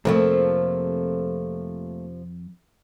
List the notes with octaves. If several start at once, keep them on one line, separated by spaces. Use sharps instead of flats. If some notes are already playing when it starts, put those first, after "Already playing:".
C2 F2 C3 F3 A3 A#3 A4